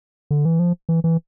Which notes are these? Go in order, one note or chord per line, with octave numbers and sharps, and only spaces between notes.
D3
E3
F3
E3
E3